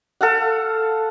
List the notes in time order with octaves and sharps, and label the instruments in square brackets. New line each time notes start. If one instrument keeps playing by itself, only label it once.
[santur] A4 F5 F#5